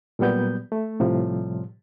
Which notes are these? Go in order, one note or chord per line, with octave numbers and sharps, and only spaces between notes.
A#2 F#3 G3 B3 G6
A3
A2 C3 F3 G3